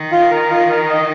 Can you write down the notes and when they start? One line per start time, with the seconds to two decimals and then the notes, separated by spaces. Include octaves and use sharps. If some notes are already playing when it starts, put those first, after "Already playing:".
Already playing: D#3
0.12 F4
0.31 A#4
0.50 F4
0.70 A#4
0.89 D#5